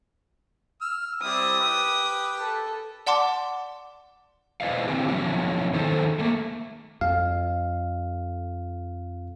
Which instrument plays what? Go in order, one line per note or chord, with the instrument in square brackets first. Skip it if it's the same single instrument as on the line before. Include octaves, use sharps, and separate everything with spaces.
[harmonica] E6 F6
[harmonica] G3 C4 E4 [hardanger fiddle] D#6
[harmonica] G4 B4
[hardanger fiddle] A4
[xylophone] D5 F#5 A5 C6 D6
[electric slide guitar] E4 B4 C5 D5 D#5 F5
D3 C4 G4
F3 F#3 B3 C#4 E4
D#3 D#4 G#4 A4 C5
A3 A#3
[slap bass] F2 [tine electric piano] F5